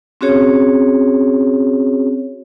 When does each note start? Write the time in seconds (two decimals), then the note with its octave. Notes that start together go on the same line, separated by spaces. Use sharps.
0.21 C4 C#4 F#4 G#4 C#5